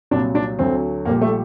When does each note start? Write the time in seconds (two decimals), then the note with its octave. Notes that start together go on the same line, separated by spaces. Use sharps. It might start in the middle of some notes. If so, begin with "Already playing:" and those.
0.11 C2 A#2 F#3 D4
0.35 D4
0.59 D2 D3 F#3 C4
1.05 A#1 A#2 G3 A#3
1.21 A3